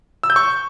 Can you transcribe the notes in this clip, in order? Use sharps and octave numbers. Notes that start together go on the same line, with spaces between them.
E6
G6
C#6